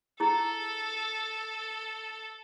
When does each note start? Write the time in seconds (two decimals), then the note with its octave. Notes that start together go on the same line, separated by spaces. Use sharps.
0.20 E4 G#4 A4